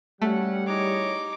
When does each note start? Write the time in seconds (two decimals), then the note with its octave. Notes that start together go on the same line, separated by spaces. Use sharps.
0.22 G3 A3 C#4 F#4 F#5
0.67 D#4 E4 G#4 C#5 D6